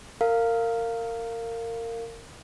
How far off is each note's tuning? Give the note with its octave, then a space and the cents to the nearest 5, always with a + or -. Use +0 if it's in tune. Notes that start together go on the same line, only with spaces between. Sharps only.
A#4 -25 F5 +0